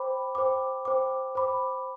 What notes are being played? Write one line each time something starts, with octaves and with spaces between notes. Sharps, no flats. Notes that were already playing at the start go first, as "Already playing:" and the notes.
Already playing: C5 G5 B5 D6
C5 G5 B5 D6
C5 G5 B5 D6
C5 G5 B5 D6